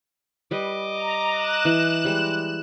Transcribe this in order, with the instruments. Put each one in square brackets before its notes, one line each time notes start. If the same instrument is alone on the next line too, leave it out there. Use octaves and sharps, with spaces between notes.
[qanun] G3 B4 [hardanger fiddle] D#5 D6
[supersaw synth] A#5
F#6 E7
[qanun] E3
G3 G#3